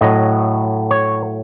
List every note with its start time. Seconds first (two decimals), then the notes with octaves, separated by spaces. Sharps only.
0.01 A2 F#3 D#5
0.91 C#5